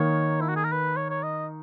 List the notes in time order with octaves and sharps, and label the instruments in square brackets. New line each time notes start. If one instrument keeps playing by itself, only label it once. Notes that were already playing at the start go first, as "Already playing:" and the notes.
Already playing: [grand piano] D#3 A#3 D#4 [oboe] C#5
[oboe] E4
F#4
G#4
A#4
B4
C#5
C#5
D#5